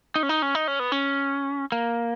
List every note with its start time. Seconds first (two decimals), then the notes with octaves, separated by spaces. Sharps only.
0.16 D#4
0.23 C#4
0.29 D#4
0.42 C#4
0.55 D#4
0.68 C#4
0.79 B3
0.92 C#4
1.72 A#3